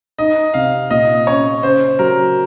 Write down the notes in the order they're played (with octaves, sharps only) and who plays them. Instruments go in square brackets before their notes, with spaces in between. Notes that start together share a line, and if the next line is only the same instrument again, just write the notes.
[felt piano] D#4 [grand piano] D#5
[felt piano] C3 [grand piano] F5
[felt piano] A#2 [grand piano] D#5
[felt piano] C#4 [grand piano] C#5
[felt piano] C#3 [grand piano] C5
[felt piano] F#3 [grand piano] A#4